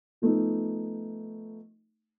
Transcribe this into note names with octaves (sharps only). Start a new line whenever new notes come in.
F3 A3 B3 D#4